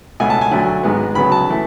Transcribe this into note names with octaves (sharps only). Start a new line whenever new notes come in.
C#2 B2 A3 G#5
A5
G#5
D2 D3 F#3 A3
G#1 G#2 G#3 B3
D2 C#3 F#3 B3 B5
A5
E3 A3